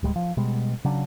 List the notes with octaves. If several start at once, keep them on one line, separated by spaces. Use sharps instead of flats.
D1 G3 G#3
F3
B2 G3 G#3
C#3 F#3 D4